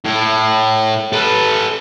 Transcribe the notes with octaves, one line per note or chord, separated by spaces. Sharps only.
A2
A4 B4